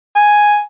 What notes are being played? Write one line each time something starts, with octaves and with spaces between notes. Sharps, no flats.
G#5